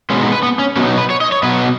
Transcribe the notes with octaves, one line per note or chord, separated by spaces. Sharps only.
B2 G#3 B3 C#4
D#4
B4
B3
C#4
B2 F#3 B3 C#4
D#4
B4
C#5
D#5
C#5
B2 F#3 B3 B4